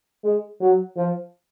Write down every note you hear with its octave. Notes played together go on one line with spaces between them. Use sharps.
G#3
F#3
F3